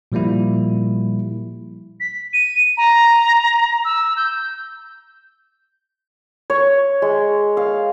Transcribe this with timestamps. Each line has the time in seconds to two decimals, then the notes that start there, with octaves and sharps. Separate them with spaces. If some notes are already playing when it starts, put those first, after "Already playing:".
0.12 A#2 F3 G3 A#3 E4
2.00 B6
2.33 D#7
2.77 A#5
3.85 E6
4.17 G6
6.50 C#5
7.02 G#3
7.57 F5